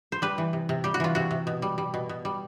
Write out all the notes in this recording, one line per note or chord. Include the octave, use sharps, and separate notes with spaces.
C5
G3 B4
E3
C3
C3
G3 G4
F#4
E3 F4
C3 F#4
C3
B2
G3
G3
B2
B2
G3